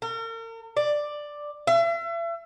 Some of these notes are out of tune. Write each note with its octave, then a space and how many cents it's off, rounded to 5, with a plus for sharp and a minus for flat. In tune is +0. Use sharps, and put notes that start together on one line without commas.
A#4 -40
D5 +5
E5 +40